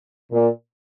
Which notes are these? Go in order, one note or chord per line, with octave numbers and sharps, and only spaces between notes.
A#2